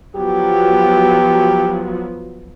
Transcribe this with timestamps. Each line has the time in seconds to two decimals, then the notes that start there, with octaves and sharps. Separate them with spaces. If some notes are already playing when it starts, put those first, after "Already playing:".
0.16 F3 F#3 B3 G4